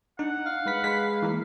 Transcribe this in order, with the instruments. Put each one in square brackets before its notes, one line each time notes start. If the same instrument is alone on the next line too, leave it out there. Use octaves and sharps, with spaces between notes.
[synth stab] D4 [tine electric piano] D#4 [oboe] F#5
[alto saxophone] F5
[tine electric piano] G#3 B4 B6
[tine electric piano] G#3 B4 [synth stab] B6
[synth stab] E3 A#3